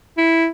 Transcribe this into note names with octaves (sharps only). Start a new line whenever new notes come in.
E4